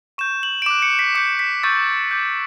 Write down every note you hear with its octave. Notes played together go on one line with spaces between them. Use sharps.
C#6 G6 E7
F#7
D7
D6 F#6 E7
C#7
B6
D6 G6 C#7
B6
C#6 E6 G6 A6
D6 G6